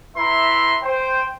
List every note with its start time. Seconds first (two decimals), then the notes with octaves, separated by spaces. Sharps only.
0.17 E4 B4 E5 A#5 C6
0.83 C5 G5